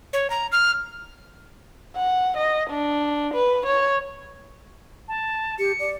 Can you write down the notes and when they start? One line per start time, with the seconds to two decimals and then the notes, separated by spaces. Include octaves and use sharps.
0.13 C#5
0.30 A#5
0.52 F6
1.96 F#5
2.37 D#5
2.70 D4
3.34 B4
3.66 C#5
5.08 A5
5.59 G4 C#7
5.80 D5